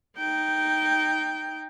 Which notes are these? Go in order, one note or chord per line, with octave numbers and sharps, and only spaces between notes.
D#4 G5